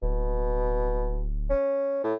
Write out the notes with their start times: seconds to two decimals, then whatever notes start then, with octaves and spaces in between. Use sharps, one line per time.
0.02 D1 B2
1.50 C#4
2.04 A2